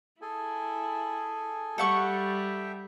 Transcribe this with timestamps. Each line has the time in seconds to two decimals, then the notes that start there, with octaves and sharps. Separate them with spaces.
0.22 E4 G#4 A4 G#5
1.78 G3 A4 E5 F#5 G5 C#6